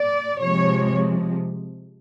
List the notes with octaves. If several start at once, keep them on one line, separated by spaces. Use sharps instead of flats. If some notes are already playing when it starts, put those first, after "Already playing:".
Already playing: D5
C3 F3 G#3 C#5